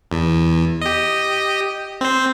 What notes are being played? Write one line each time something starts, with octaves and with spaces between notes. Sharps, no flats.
E2
G4 D#5
C4 C5